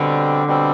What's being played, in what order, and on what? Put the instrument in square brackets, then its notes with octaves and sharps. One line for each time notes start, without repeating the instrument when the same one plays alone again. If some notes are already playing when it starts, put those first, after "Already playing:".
Already playing: [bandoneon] B2 G3 C4 [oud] D3
[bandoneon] B2 G3 C4